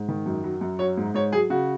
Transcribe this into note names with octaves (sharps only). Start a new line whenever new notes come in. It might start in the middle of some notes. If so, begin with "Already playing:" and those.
Already playing: G#2
D#3
F#2
F#3
F#2
F#3 C#5
G#2
G#2 C#5
F#3 G#4
C#3 F#4